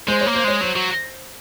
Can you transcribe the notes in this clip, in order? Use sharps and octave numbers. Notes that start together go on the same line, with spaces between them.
G#3 C5
C#5
A#3
C5
G#3 C#5
F#3 C5
F#3